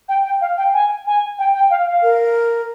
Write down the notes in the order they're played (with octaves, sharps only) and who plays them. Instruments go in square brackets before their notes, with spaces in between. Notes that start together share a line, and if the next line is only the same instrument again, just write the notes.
[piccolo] G5
G5
F5
G5
G#5
G#5
G5
G5
F5
F5
[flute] A#4